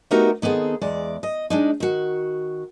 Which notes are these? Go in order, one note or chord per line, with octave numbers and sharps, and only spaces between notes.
A3 B3 D#4 F#4 G4 A#4
D#3 B3 C4 G#4 A4
E2 G#3 D5
D#5
G#3 D4 D#4
D#3 F#4